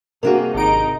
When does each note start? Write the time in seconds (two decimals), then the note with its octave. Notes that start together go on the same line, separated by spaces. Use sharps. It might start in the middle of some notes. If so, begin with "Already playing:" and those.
0.23 C3 A#3 D4 F#4 G#4 A#4
0.55 G#1 D#4 A#5 D7